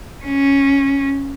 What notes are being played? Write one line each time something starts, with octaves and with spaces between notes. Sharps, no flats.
C#4